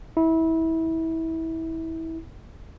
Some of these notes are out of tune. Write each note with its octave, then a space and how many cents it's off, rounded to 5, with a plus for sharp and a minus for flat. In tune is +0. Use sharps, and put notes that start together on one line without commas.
E4 -25